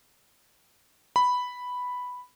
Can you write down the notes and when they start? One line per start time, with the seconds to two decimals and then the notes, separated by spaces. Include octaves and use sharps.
1.16 B5